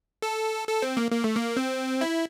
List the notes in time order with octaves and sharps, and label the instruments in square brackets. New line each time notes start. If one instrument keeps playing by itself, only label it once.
[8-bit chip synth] A4
A4
C4
A#3
A#3
A3
A#3
C4
E4